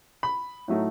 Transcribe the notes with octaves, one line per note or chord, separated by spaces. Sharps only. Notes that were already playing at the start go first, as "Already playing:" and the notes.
B5
A2 F#3 A3 D#4